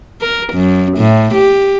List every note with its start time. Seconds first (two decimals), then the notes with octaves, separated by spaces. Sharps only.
0.21 A#4
0.53 F#2
0.98 A2
1.34 G4